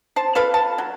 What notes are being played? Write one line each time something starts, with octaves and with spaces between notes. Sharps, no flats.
C5 A5
F4 A4 B4 F5
A5
F#3